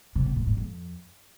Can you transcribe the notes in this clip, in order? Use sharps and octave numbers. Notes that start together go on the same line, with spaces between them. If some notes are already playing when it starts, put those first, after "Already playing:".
C3
C3
A#2
G#2
F2